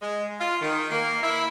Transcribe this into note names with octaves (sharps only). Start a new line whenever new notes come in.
G#3
F4
D#3
A#3
E4